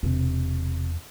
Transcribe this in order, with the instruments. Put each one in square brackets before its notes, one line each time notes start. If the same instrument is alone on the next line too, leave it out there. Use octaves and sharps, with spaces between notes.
[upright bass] E1 C3 [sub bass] E2